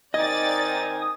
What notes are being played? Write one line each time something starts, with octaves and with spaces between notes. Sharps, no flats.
D#3 C4 D#4 D5 D#5 G#5 D#6 A6